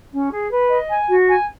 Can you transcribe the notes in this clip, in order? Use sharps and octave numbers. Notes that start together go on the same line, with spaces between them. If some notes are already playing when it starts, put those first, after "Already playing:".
C#4
G#4
B4
D#5
G#5
F#4
G#5